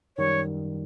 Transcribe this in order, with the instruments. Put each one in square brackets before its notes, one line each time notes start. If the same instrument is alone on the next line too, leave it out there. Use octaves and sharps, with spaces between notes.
[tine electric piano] F#2 D#3 G3 [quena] C#5